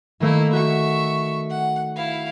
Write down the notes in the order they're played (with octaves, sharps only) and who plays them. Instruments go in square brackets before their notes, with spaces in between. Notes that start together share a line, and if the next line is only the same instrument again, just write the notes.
[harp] D#3 A3 [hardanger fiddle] A#3 E4
[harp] F#4 [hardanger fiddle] E5 C#6
[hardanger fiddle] F#5
E4 F5